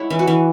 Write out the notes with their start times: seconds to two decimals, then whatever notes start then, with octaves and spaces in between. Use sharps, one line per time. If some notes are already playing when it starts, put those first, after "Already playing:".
Already playing: G#3 E4 C#5 F#5
0.10 E3
0.19 F#4
0.27 E3